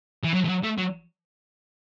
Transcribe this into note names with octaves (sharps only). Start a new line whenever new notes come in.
E3
F#3
E3
F#3
A3
F#3